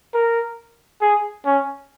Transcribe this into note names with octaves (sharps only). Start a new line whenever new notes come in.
A#4
G#4
C#4